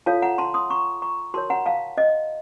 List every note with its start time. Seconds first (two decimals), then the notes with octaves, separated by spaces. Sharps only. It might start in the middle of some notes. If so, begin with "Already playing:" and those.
0.06 F4 A4 C#5 F5 A5
0.22 F#5 A#5
0.38 A5 C6
0.54 C6 D#6
0.70 A#5 C#6
1.02 A#5 C#6
1.34 F#4 A#4 C#5 A5 C6
1.50 F#5 A#5
1.66 F5 A5
1.98 D#5